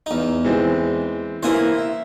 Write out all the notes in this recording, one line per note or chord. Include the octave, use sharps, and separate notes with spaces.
E2 D#4
E3 G#3 C4
E3 A#3 E4 C5 G#5 D#6
E5